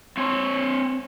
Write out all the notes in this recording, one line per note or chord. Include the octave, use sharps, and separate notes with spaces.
C4 C#5